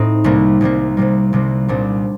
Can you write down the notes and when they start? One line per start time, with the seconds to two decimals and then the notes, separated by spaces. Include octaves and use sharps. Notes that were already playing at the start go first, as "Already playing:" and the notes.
Already playing: A2 C4 D#4
0.24 C2 C3 G3 A#3
0.61 C2 C3 G3 A#3
0.97 C2 C3 G3 A#3
1.33 C2 C3 G3 A#3
1.68 C2 A#2 G3 D4